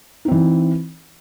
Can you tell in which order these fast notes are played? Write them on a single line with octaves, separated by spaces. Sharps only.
D#4 C4 E3